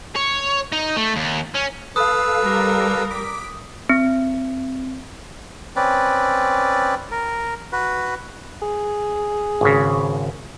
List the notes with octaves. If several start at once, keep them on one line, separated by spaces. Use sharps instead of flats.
C#5
D#4
A3
D#2
C#4
A4 B4 F5 D#6 E6
G3 A#4
D6 B6
C4
C4 C#4 B4 D5
A#4
F#4 B4
G#4
G#1 C#3